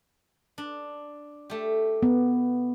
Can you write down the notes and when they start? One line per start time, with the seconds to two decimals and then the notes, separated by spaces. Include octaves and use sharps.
0.58 D4
1.50 A3 G4
2.03 B3